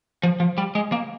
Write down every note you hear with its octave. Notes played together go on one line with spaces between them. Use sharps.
F3
F3
G3
G#3
A#3